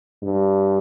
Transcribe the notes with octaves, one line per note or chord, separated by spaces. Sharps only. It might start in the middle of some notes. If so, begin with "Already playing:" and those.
G2